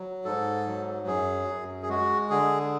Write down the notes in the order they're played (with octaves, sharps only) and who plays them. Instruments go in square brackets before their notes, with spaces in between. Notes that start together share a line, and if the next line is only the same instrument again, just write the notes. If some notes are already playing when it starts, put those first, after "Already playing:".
Already playing: [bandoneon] F#3
G#2 A4
F#3
F#2 G#4
F#2
G#4
G#3 F#4
D3 G#4